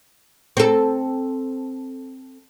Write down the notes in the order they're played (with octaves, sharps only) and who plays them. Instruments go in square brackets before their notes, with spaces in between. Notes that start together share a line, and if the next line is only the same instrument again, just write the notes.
[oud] C4 A4